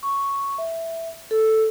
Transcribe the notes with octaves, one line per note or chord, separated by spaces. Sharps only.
C#6
E5
A4